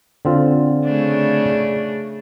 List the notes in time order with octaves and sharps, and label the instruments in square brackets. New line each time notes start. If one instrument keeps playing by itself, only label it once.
[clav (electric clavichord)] D3 C4 F4
[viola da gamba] C#3 A3 D4